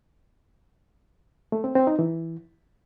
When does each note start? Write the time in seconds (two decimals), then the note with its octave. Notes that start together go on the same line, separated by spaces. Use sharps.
1.52 A3
1.64 C4
1.76 C4
1.87 D#4
1.99 E3